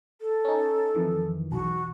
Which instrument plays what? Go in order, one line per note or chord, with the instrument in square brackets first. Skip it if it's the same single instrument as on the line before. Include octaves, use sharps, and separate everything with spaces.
[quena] A4
[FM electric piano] C#4 D#4
F2 D#3 E3
[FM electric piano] B1 E2 [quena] F#4